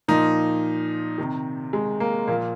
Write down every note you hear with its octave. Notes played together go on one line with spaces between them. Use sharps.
A#2 F3 D#4
C3 D#3
G#3
A#3
A#2 F3 A#3